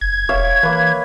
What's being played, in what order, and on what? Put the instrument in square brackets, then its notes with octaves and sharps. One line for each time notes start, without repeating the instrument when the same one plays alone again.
[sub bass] F#1 [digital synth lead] G#6
[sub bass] E1 [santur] C#5 E5 F5
[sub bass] E3 [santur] A#3 B4